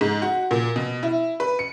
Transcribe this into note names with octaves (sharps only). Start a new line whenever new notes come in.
G#2
F#4
A#2
B2
E4
B4
C#7